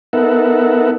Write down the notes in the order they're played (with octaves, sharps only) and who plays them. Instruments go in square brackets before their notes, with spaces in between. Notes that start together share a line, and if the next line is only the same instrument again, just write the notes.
[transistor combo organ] B3 D#4 A4 A#4 E5 F#5